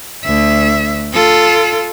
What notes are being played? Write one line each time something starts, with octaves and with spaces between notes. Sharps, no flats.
D2 E5
F4 A4